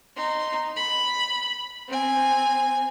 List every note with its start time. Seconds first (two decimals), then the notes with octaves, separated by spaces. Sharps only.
0.17 D#4 C6
0.77 B5
1.88 C4 G#5